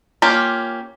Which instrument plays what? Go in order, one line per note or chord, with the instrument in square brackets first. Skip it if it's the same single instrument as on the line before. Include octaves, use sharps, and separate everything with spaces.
[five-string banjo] A#3 C#4 F4 G4